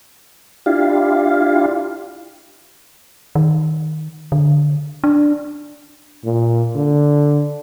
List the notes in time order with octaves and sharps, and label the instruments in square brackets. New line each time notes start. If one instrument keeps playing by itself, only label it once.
[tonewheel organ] D4 E4 F4 G4 F5
[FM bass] D#3
D3
D4
[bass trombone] A#2
D3